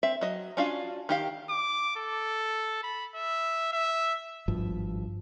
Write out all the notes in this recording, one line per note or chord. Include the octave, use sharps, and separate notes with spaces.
C4 E5
F#3 D#5
C#4 D4 F4 F#4 F5
D#3 G4 F5
D6
A4
B5
E5
E5
G#1 G2 F3